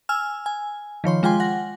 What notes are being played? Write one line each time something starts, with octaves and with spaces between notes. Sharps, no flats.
G#5 E6 F6
G#5
D#3 F3 C#5 C6
G#3 F4 G5 G#5 C6
F#5 A#6